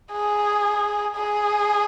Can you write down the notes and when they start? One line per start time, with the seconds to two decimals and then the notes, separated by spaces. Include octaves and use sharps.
0.12 G#4
1.16 G#4